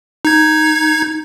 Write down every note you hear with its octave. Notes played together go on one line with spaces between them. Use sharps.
D#4 G#6